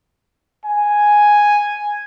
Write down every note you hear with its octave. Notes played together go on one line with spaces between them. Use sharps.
G#5